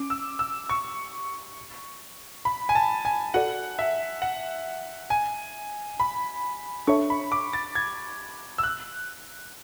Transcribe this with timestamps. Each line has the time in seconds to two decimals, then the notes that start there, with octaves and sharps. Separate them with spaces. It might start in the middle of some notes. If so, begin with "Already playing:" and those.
Already playing: C#4 D6
0.10 E6
0.39 E6
0.70 C#6
2.45 B5
2.69 G#5
2.75 A5
3.05 G#5
3.34 F#4 A4 D5 F#5
3.79 E5
4.22 F#5
5.10 G#5
6.00 B5
6.87 D4 A4 C#5 E5 C#6
7.10 B5
7.32 D6
7.53 A6
7.75 G#6
8.58 E6
8.63 F#6